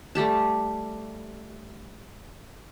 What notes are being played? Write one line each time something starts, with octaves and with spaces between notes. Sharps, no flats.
G3 A3 G4 A5